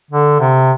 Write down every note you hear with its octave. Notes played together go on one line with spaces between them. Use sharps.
D3
C3